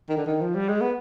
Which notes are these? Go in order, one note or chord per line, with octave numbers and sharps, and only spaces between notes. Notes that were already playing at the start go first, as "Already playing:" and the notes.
D#3
D3
D#3
F3
G3
G#3
B3